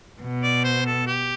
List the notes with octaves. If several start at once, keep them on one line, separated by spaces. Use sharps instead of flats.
B2
D5
C5
A4
G4